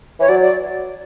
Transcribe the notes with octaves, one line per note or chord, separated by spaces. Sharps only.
E3 C#5
F#3 D5
D5